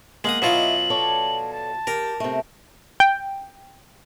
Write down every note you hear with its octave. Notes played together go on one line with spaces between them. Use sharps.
G#3 A#3 F#5 D#6 F#7
B2 F#3 E4 F4 D#5
A4 C#5 D5
A5
G4 A#4
C3 A3
G5